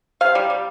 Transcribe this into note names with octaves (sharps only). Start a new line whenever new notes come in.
C3 F5
G3
G3